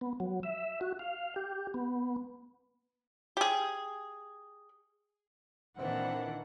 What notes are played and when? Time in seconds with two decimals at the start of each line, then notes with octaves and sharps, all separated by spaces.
0.01 B3
0.20 F#3
0.43 E5
0.81 F#4
0.99 F5
1.36 G4
1.74 B3
3.37 G4 G#4
5.79 A#2 D#3 E3 C4 D4 F#5